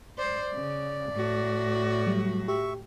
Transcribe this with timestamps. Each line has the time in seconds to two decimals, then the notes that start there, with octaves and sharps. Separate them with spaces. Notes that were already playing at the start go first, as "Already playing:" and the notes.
0.18 C5 D5
0.54 C#3
1.13 A2 F#4
2.07 F#3 G3
2.48 G4 E5 C#6